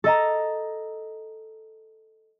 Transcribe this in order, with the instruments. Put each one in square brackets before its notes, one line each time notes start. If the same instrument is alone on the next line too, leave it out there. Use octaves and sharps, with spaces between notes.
[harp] A4 D#5 A#5